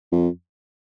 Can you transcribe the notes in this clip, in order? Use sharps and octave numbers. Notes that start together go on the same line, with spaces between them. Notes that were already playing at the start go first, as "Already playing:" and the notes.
F2